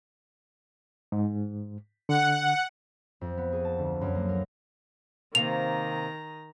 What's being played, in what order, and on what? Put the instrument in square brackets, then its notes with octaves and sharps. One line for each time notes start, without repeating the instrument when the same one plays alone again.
[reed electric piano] G#2
[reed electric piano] D3 [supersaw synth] F#5
[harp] F2
B3
G#4
A5
D2
F#2
A#3
A#4
[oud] C3 A#3 [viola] D#3 A#5 [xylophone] F7